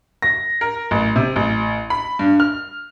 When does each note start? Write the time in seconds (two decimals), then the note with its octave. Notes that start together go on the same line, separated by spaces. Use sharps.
0.22 A#6
0.61 A#4
0.91 A1
1.16 C3
1.36 A1
1.90 B5
2.19 G2
2.40 F6